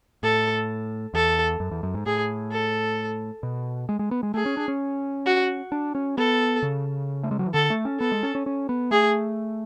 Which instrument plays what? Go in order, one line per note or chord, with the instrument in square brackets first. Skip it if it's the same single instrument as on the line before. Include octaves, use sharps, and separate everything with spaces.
[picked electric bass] A2 [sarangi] A4
[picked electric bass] E2 [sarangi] A4
[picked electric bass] F#2
E2
F#2
G#2
[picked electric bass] A2 [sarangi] G#4
[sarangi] A4
[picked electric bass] B2
G#3
G#3
B3
G#3
[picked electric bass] A3 [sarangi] G#4
[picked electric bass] C#4
D4
C#4
[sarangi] F#4
[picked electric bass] D4
C#4
[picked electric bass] B3 [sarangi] A4
[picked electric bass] C#3
A3
G#3
F#3
E3
[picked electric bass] D3 [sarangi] A4
[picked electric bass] A3
C#4
[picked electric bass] B3 [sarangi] A4
[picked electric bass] G#3
C#4
C#4
C#4
B3
[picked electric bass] A3 [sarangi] G#4